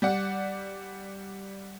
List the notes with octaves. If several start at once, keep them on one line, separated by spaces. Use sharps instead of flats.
G3 D5 F#5